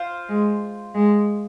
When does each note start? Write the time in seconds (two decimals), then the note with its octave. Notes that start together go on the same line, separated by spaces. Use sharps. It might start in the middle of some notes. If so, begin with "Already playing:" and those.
Already playing: F4 C5 F5
0.29 G#3
0.95 G#3